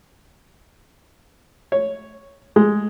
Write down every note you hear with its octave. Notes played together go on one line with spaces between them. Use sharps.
C#5
G#3